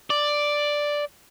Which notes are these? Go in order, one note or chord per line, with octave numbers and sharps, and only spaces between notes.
D5